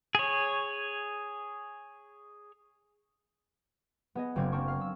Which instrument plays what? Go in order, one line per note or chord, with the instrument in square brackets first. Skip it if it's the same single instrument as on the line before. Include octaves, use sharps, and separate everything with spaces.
[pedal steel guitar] G#4 C#5
[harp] B3 G#4 D#5
F#1 C#3 C4 D6 G#6
A#3 C4 D4 C#6
F5
E6